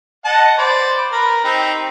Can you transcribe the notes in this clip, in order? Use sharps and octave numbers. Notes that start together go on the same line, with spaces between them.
D#5 F#5 A5
B4 C5 D5
A#4 B4
C4 D#4 G4